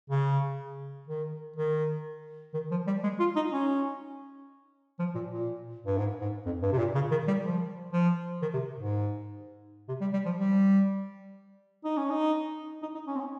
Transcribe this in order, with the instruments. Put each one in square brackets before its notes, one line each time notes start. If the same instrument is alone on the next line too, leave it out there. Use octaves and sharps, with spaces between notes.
[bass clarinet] C#3
D#3
D#3
D#3
F3
G3
G#3
F4
D#4
C#4
F3
A#2
A#2
G2
G#2
G#2
F2
G2
C3
A#2
C#3
D#3
G3
F3
F3
D#3
C3
G#2
C3
G3
G3
F3
G3
D#4
C#4
D#4
D#4
D#4
C#4
C4
C#4